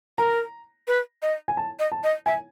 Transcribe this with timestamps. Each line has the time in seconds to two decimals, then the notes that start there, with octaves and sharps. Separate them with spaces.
0.18 A#4 A#5
0.88 B4
1.22 D#5
1.48 G#5
1.57 A5
1.79 D#5
1.92 A5
2.04 D#5
2.26 E5 G#5